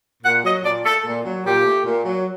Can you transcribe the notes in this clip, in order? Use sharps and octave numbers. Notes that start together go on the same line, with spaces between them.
A#2 F#5
F#3 D#5
A#2 D5
A3 A4
A#2
F#3
A#2 G4
A3
A#2
F#3